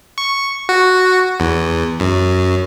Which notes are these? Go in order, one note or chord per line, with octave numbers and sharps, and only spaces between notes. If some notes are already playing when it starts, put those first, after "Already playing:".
C#6
F#4
E2
F#2